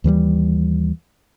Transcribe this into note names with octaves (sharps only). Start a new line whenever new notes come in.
D#2 E3 F#3 G3